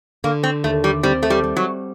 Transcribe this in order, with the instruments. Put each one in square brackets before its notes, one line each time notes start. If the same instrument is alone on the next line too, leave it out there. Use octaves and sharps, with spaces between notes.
[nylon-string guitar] D3 [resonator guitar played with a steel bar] A#3
[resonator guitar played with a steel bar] C4
[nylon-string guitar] D#2 [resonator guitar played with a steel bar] A3
[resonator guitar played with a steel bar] G3
[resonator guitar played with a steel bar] G3 [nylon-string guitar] C4
[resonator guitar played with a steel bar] A3
G3
[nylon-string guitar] G3
[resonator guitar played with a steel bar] F#3